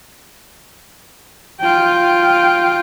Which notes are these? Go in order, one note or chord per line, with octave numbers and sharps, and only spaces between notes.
F4 G5